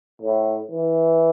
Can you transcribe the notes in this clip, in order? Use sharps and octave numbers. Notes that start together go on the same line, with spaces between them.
A2
E3